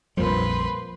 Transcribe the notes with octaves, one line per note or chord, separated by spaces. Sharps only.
A#1 F2 F3 G3 A#3 B4 C5 C6